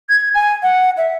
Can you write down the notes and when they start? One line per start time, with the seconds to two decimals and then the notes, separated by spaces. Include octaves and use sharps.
0.09 G#6
0.34 G#5
0.62 F#5
0.97 E5